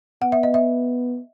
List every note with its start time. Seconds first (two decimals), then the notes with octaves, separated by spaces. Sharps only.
0.22 B3 F#5
0.32 E5
0.43 D#5
0.54 E5